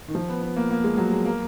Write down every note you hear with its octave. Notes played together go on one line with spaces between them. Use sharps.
D#3
F3
B3
B3
A#3
A#3
G#3
F#3
G#3
A#3